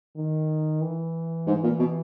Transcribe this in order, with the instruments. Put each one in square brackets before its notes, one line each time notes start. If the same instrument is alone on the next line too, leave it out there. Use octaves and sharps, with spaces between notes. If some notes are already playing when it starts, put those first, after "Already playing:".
[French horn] D#3
E3
[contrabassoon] G#2
A#2
B2